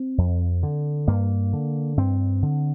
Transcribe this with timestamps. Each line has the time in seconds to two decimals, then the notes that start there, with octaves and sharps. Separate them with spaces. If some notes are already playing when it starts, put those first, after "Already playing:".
Already playing: C4
0.18 F2
0.63 D3
1.08 G2 A#3
1.53 D3
1.97 G2 C4
2.42 D3